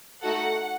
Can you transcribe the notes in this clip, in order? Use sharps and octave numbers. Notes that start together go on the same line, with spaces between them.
A3 D#4 F#4 A4 F#5